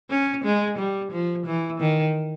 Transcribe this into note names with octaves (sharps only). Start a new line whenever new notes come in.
C#4
G#3
G3
F3
E3
D#3